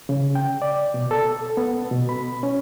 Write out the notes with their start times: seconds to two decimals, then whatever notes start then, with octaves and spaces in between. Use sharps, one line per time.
0.09 C#3
0.35 G5
0.62 D5
0.94 B2
1.11 A4
1.57 B3
1.91 B2
2.09 B5
2.43 C#4